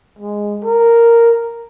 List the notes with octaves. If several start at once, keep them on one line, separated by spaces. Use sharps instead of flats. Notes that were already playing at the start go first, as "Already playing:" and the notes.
G#3
A#4